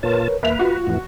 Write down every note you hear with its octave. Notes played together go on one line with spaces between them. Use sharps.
A#2 F4 A#4 B4 C#5 A5
D#2 A#3 B4 E5 F7
F4 F#4
F2 A2 E3